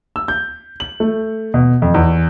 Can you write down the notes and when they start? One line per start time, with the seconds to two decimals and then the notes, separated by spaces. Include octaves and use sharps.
0.16 E6
0.28 G6
0.80 F#7
1.00 A3
1.54 B2
1.82 F2
1.94 E2